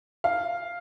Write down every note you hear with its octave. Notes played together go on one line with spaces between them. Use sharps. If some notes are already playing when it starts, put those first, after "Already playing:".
F5